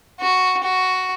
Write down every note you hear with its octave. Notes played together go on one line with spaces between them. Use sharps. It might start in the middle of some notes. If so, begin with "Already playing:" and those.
F#4
F#4